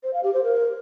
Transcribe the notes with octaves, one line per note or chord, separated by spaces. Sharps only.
C5
F5
G4
C5
A#4